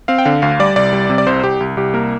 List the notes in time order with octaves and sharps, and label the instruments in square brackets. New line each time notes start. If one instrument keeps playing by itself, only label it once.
[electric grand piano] C4 F5
G5
D3 F5
D2 F5
G3 D5
C2 D5
G3
C3
D5
C2 C5
C2 G4
C2
C2 G4
A#3 A#4